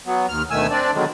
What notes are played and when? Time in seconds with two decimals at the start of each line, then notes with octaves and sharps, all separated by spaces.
0.06 F#3 B3
0.29 D#2 F6
0.51 D2 B2 D#3 A3 G#5 E6
0.71 C4 D4 D5
0.94 B2 D3 D#3 F#3 G#3